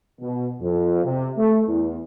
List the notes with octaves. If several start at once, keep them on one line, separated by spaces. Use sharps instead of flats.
B2
F2
C3
A3
E2